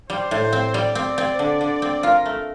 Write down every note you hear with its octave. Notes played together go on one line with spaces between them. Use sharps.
G3 C5
A2
C4
G3 D5
C4
C4
D3
D3
C4
F4 A#4
A3